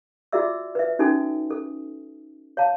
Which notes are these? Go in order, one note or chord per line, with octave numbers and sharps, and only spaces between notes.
F4 F#4 G#4 D5 E5 E6
B4 E5
C#4 D#4 F#4 A4 G#5
A4
C#5 F5 A5